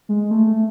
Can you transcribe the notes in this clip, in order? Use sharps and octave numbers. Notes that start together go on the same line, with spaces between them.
G#3
A3
A3